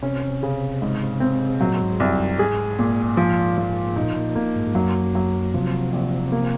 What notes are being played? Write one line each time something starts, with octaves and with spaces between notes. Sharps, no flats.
C3 C#4
C#3
G#2
C4
A#2 F#3
G#2
C2 F#2
F#2
G#2 G#4
A#2
F3
F3
A#2 D#4
A#2
A#3
G#2
G#2
F#2 F#3
F#3
C3 F3
A#1
A#3